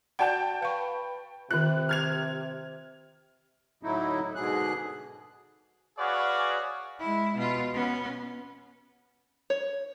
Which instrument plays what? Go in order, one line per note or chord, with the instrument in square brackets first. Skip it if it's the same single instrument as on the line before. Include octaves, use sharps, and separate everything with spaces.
[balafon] F#4 D5 F#5 [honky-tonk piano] G5 A5 G6
[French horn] B4 [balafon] F5 C#6
[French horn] C3 [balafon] D#3 F4 [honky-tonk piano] F#6
[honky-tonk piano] F6 G#6 F7
[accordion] A2 D3 F#3 A3 D#4 E4
G#2 B2 D3 G#4 F#6
[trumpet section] F#4 G#4 B4 C#5 D5 F5
[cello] G#3 E4
B2 F4
B3 C#4
[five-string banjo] C#5